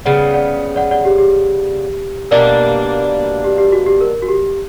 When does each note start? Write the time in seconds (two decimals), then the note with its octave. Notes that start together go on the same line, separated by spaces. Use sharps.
0.05 C#3 G3 B3 D5 F#5
0.34 D5 F#5
0.76 D5 F#5
0.91 D5 F#5
1.05 G4
1.18 G4
2.31 B2 G3 A#3 D4 A#4
3.44 G4
3.58 G4
3.72 F#4
3.86 G4
4.01 A#4
4.22 F#4
4.28 G4